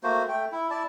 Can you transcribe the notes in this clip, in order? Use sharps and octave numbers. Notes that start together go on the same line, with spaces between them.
A3 A#3 F#4 C5
A3 G5
E4
E4 D5 A5